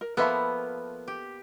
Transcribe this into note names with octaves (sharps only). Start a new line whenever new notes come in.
A#4
F3 A#3 B3 A4 E5 B5
G4